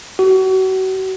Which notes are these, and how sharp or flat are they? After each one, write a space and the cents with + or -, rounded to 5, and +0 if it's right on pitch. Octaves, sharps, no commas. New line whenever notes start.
F#4 +35